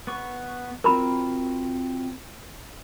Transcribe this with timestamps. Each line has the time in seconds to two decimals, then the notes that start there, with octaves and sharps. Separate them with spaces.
0.07 B3 C#6
0.84 C4 F4 F#4 A#4 A#5 B5